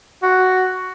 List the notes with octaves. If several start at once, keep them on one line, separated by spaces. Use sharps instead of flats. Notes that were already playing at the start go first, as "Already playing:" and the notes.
F#4